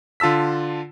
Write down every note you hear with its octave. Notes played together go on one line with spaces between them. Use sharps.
D3 F4 A5 E6 B6